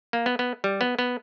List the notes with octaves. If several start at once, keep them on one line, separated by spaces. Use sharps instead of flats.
A#3
B3
B3
G3
B3
B3